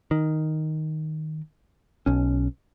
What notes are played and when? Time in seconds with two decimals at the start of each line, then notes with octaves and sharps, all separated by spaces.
0.11 D#3
2.06 B1 C#4